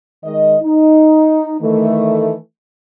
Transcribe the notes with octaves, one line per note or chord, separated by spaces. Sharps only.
D#3 G#3 D#5
D#4
D#3 E3 A3